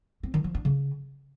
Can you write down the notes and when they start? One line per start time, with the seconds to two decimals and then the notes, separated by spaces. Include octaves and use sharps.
0.23 C4
0.34 D#3
0.44 F3
0.55 D4
0.65 C#3